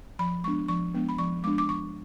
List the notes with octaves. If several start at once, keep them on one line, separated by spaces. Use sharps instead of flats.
F3 B5
G#3 B3 D4 C#6
F3 C#6
G#3 B3 D4
B5
F3 C#6
G#3 B3 D4 D6
D6
F3 C#6